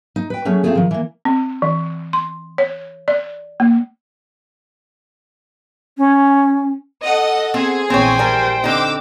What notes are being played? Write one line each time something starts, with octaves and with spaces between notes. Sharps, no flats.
D#4
B4 G5
F#3 A3 C#4 G#4
A3 C4 F4 G#4 A4
D#3 F3
E3 A#3
C4
E3
C6
C#5
D5
A#3
C#4
A4 D#5 F#5
C4 G#4 C5
A#1 E3 C4 C5 C#5 G5 G#5
G3 A#4
D3 C4 D#4 D6 E6